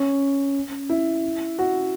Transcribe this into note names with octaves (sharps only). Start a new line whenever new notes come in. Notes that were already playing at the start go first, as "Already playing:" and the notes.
Already playing: C#4
E4
F#4